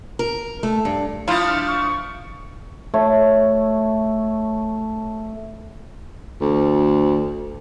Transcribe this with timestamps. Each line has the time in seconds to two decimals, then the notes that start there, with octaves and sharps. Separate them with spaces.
0.19 A#4
0.63 A3
0.85 G2
1.28 F3 A3 D4 E4 F4 F5
1.47 F6
1.68 C#6
2.94 A3 C#5
6.41 D2